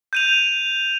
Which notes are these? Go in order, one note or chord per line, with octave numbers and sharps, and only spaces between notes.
G6 D#7 F7